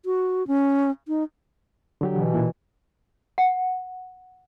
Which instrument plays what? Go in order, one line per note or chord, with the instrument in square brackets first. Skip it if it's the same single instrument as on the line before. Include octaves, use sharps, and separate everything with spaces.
[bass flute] F#4
C#4
D#4
[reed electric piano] D3 F#3 G4
[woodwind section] B2 E3
[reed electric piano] A#2 E4
[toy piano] F#5